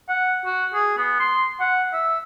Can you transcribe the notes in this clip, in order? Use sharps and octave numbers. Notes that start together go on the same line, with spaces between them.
F#5
F#4
G#4
B3
C6
F#5
E5